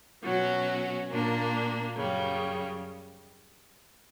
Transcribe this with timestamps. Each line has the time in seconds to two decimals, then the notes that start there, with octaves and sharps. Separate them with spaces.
0.23 B2 F#3 C#4 F#4
1.09 A#2 A#3 D4
1.96 F#2 C#3 G3